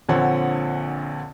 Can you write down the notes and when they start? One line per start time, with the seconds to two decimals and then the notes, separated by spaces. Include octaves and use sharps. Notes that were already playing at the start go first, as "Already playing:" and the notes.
0.09 A#1 A#2 D3 C4 C#5 F#5